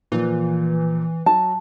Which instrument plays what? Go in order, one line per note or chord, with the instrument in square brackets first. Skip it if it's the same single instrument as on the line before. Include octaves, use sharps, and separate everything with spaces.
[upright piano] A#2 F3 [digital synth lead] E3
[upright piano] F#3 F#4 [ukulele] A5